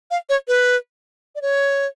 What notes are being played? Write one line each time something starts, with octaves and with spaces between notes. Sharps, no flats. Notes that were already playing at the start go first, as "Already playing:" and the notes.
F5
C#5
B4
D5
C#5